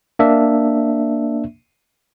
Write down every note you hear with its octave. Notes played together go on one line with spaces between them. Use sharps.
A#3 D4 E5